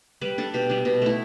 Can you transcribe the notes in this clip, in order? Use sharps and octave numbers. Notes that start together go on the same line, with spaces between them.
G3 B4
D4 A4
B2 G4
G3 D4
B2
A3 E4